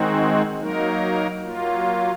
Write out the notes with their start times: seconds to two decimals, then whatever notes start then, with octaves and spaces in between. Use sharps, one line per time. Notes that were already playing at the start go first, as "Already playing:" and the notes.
Already playing: D#3 G#3 C4 D#4 F#4
0.59 F#3 A#3 D#4 A#4
1.44 F#3 A#3 F4